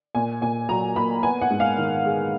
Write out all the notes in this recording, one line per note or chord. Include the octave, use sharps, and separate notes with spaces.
A#2 G#5
A#2 G#5
F#3 A#5
A#3 B5
B3 G#5
F#5
G#2
F5
D#3
G#3